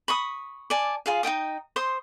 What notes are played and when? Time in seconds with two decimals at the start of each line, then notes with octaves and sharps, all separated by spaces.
0.08 B5 C#6 D#6
0.70 D5 G#5 A5
1.06 F4 G#4 F5
1.23 D#4 F4 G5 D#6
1.76 C5 C6 D#6